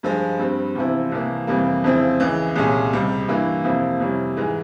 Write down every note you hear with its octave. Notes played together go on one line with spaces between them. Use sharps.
G2 F3 G#3
G2 G3 C4
E2 C3 F3 C4 E4
C2 C3 E3 A#3
F2 C3 E3 G3 A#3
F2 C#3 F3 C4 E4
C#2 C#3 E3
C2 A#2 G#3 C#4
C#2 C3 G3
G2 E3 A#3 E4
F2 C3 F3 A#3 E4
F2 C3 G3 C#4 E4
G#2 E3 G#3